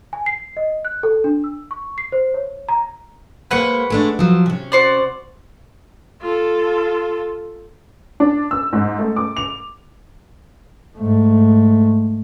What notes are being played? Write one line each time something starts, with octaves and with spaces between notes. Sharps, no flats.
G#5
C7
D#5
F#6
A4
D4
E6
C#6
C7
C5
C#5
A#5
G#3 A#3 B4 C5 F#5 C#6
G#3 A3 D4
F3 F#3
C3 C#4
F#4 C5 D5
F4 A4
D4
E6
G#2
A3
D6
F7
G#2 A3